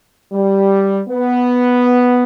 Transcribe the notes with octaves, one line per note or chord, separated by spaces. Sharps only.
G3
B3